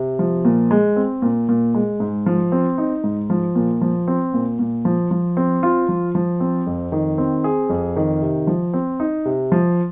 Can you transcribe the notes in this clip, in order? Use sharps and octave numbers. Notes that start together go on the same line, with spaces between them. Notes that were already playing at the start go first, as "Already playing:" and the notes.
Already playing: C3
F3
A#2
G#3
C4
A#2
A#2
G#3
G#2
F3
C4
D#4
G#2
F3
A#2
F3
C4
A#2
A#2
F3
F3
C4
F4
F3
F3
C4
F2
D#3
C4
G#4
F2
D#3
C3
F3
C4
D#4
C3
F3